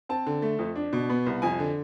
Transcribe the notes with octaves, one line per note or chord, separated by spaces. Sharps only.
C4 A5
D3
A3
F2
D4
B2
B3
C2
F2 G#5
D3